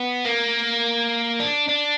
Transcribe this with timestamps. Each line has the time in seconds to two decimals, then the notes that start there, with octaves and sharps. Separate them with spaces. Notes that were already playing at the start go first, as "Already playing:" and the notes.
Already playing: B3
0.25 A#3
1.40 D4
1.69 D4